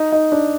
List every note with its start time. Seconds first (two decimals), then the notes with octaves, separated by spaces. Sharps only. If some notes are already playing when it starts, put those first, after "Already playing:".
Already playing: D#4
0.12 D#4
0.32 D4